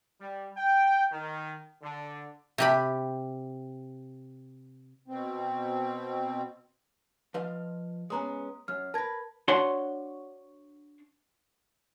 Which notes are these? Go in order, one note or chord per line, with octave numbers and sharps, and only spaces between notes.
G3
G5
D#3
D3
C3 G4 B5
B2 C4
F3 B4 D#5 F5
G#3 B3 C#4 A#5 D#6
F#2 F6
A#4 B4 A5 G#6 A#6
D4 F#4 C#5 F#5 C6